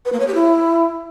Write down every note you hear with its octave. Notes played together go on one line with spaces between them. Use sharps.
B4
A#3
C#5
G4
E4